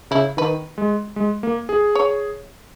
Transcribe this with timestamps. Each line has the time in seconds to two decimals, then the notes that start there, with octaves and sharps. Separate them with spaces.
0.11 C#3 E4
0.37 D#3 B4
0.78 G#3
1.16 G#3
1.43 A#3
1.69 G#4
1.95 C#5